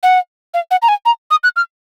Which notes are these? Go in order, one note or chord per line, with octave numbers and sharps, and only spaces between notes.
F#5
F5
F#5
A#5
G#5
A#5
D#6
F#6
F6